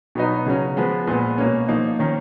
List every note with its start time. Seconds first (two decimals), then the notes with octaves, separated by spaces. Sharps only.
0.15 B2 F#3 B3 D#4
0.46 C#3 F#3 C#4
0.77 F3 G#3 B3
1.07 A#2 G#3 B3
1.38 B2 A#3 C#4
1.68 F3 A#3 D#4
1.99 D#3 A#3 C#4